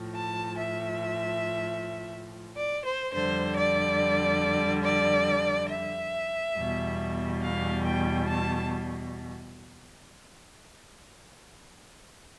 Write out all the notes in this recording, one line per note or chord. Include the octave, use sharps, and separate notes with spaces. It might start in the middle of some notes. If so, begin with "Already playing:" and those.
Already playing: A2 F3
A5
E5
D5
C5
F2 D3 G3 C5
D5
D5
E5
E2 B2 G3
F5
G5
A5